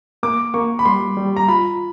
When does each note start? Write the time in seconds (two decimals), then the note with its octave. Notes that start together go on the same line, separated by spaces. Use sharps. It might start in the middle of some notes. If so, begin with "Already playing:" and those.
0.23 A#3 D6
0.54 A#3 C#6
0.79 B5
0.85 G3 C6
1.17 G3
1.37 A#5
1.48 F4 B5